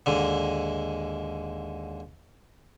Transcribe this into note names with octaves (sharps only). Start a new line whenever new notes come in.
D#2 G#2 D3